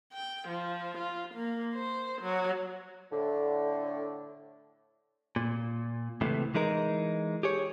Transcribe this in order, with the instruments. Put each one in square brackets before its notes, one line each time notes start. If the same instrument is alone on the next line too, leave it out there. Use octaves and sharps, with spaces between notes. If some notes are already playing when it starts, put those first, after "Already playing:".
[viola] G5
F3
F4
A#3
C5
F#3
[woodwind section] A2 D3
[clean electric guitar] A#2
C#2 A2 C3 E3 A3
E3 G#3 D#4 A#4
G4 G#4 C#5